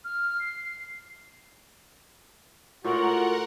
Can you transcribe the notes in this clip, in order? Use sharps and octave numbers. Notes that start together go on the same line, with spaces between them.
F6
C7
A2 F4 F#4 A#4 F#5